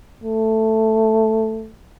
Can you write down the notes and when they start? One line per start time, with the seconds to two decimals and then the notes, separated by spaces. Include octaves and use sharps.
0.24 A3